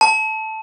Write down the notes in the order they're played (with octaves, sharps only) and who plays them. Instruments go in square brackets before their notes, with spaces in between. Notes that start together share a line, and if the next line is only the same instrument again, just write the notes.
[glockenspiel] A5